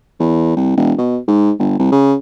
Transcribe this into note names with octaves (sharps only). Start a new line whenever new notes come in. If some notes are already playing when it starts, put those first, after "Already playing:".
E2
C2
E1
B2
G#2
G1
C2
C#3